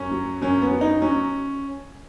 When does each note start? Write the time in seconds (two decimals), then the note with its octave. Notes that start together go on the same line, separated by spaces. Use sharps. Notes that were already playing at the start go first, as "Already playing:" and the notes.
Already playing: F#2 C#4
0.11 F#3
0.42 F#2 C#4
0.62 B3
0.71 F#3
0.81 D#4
1.02 F#3 C#4